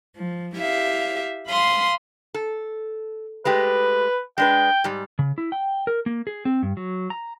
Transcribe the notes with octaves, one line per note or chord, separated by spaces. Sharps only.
F3
E4 G4 E5 F5
F5 B5 C6 D#6
A4
G#3 A3 G4 B4
G#3 D4 B4 G5
G#2 G3
C#3
E4
G5
A#4
A#3
G#4
C4
G2
F#3
A#5